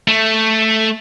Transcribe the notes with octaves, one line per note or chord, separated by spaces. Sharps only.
A3